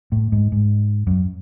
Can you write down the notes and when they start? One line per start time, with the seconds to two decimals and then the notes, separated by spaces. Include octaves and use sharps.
0.12 A2
0.32 G#2
0.52 G#2
1.07 F#2